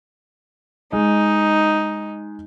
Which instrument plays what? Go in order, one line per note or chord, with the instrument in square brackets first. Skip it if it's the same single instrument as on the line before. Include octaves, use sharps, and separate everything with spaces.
[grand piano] G#3 D#5 [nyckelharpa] D#4